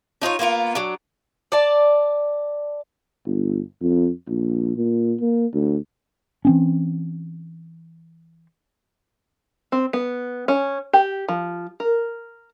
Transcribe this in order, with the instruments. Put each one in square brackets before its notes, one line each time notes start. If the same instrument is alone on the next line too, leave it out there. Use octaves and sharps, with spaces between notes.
[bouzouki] D4 D#4 F4 C#5
A#3 B3 F4 A#4
F#3 D4
D5 A5
[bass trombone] G1
F2
A#1
A#2
A#3
D2
[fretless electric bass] E3 C4 C#4
[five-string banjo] C4
B3
C#4
G4
F3
A#4